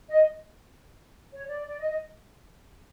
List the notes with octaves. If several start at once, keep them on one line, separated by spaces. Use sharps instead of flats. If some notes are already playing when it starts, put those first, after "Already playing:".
D#5
C#5
D5
D5
D#5
D#5